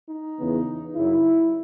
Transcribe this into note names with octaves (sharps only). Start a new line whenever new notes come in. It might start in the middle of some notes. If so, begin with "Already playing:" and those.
D#4
E2 C#3 E3 B3
F#2 C#3 F#3 E4